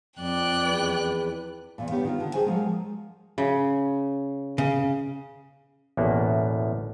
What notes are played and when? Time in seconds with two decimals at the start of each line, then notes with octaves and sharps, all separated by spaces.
0.19 F2 D5 G5 F#6
0.64 E2 B4
1.78 E2 A#2
1.91 D#3 B3 D4 G4 C#5
2.05 D#3 F4
2.20 D3
2.34 F#4 G#4 C5 G5 G#5
2.46 F3 F#3 G#3 A#3
3.38 C#3
4.58 C#3
5.97 A1 E2 B2 A#3 B3